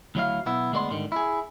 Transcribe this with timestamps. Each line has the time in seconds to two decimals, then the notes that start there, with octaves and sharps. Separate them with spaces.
0.15 D2 F#3 E4 F5
0.46 B1 B3 E4
0.72 D2 G#3 A#3 B3 D5 C6
0.90 G#2 D3 D#3 G3
1.12 E4 G#4